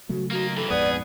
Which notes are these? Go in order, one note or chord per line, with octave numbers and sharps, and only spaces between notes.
C#3 F#3 A3 F#4
A#3 D#4 F#4
G2 E3 A4
A#1 F2 G#2 B3 G#4 D5